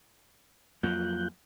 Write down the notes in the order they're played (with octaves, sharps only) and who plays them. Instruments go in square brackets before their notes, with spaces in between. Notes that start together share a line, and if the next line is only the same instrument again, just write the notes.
[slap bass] F2 F#3 A#3 [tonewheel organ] F4 F#6 G6